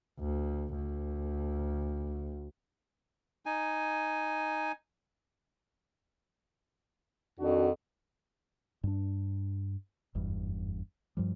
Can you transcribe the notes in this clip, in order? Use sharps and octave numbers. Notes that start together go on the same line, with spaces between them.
D2
D2
D#4 G#5
F2 D#3 D4 F#4
G2 D4
F#1 E2 G2
G2 F3 G3